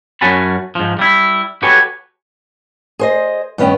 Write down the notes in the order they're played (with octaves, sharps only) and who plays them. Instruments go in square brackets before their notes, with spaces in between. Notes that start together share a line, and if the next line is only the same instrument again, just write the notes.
[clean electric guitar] F#2 C#4 F#4 G#5 A5 B5
G#2 F3
G3 E4
F#4 G4 A4 B4 C#5 G#5
[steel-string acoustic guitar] G#4 C5 D#5
G2 D#3 B3 C#4 G5